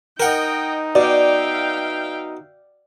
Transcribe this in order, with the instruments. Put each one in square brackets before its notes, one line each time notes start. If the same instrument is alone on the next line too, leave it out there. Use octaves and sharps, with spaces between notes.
[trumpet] D#4 [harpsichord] A#4 F#5 [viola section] D#5 G5
[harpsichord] B2 [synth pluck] D5 [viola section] E5 F5 G5